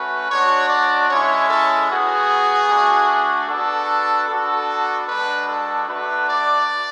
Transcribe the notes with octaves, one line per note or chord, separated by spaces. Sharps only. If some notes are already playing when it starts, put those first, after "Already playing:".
Already playing: A3 C#4 F#4 B4
G#3 D4 F#4 C#5
D5
G#3 C#4 E4 C#5
A4
B3 F#4 G#4
A3 D4 F#4
B3 D4 F#4 A4
B3 D4 F#4 A4
G#3 D4 F#4 B4
A4
A3 D4 F#4 B4
D5